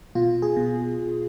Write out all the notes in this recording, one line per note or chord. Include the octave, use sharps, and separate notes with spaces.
B2 F4
G#4
B2